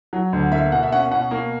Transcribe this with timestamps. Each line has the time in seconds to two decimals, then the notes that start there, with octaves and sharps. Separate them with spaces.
0.13 F#3
0.33 D2
0.51 A#3 E5
0.72 B2 F#5
0.83 E5
0.92 C#4 F#5
1.11 B2 F#5
1.31 A#3